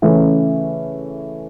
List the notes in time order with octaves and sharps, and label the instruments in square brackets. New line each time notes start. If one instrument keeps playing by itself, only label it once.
[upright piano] C#3 E3 A3 C#4